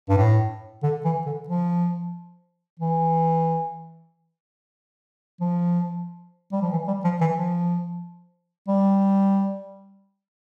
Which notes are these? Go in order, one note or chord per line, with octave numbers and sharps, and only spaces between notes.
G2
A2
D3
E3
D3
F3
E3
F3
G3
F3
E3
G3
F3
E3
F3
G3